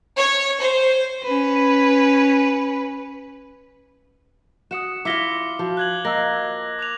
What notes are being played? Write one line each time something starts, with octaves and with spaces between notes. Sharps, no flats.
C#5
C5
C#4 B4
F#4 F#5 D#6 C#7 E7
E4 F4 F5 D6 A#6 B6 C#7 G7
F3 F#4
F#6 G#6 F#7
A#3 D#5 A5 E6 A#6
D6 F#6 F7